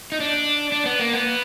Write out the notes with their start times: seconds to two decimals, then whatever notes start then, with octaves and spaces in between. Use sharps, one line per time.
0.12 D#4
0.20 D4
0.72 D4
0.86 B3
1.00 A#3
1.14 B3